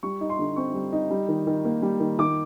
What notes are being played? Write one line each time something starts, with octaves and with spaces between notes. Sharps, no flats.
G3 C#6
D#4
C6
D3
C4 C#6
G3
D#4
G3
D#3
D#3
A#3
G3
D#3
D#3 D6